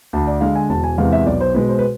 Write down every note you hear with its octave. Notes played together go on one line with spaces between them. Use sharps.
D2 A5
D5
D3 G#3 F5
G#5
E1 A5
G#5
E2 C3 G#3 F5
E5
B1 D5
C5
B2 G#3 B4
C5
B4